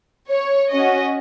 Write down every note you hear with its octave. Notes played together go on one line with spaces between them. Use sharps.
C#5
C#4 F#4 D#5